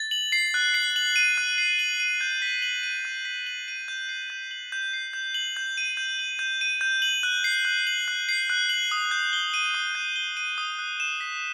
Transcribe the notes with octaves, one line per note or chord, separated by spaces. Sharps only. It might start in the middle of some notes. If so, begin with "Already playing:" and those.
Already playing: A6
F#7
C7
F#6
C7
F#7
D#7
F#6
C7
F#7
D#7
G6
B6
F#7
D#7
G6
B6
F#7
D#7
G6
C7
G6
F#7
G6
C7
G6
F#7
G6
D#7
G6
F#7
G6
D#7
G6
F#7
F#6
C7
F#6
F#7
F#6
C7
F#6
F#7
D#6
G6
G7
D#7
D#6
G6
G7
D#7
D#6
F#6
E7
B6